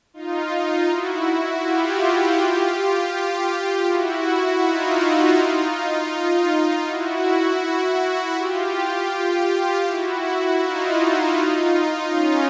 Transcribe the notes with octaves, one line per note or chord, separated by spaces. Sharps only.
D#4 F4
D#4 F4
E4 F#4
E4 F#4
F4 G4
E4 F#4
D#4 F4
E4 F#4
F4 G4
E4 F#4
D#4 F4
C#4 D#4